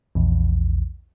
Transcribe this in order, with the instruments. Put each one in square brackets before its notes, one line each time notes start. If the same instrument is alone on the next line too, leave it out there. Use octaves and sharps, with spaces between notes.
[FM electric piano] A#1 E2